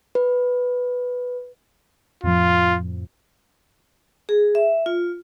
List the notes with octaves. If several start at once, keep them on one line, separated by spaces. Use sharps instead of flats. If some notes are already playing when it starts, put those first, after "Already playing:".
B4
F2 A2 F3 F4
G#4
E5
F4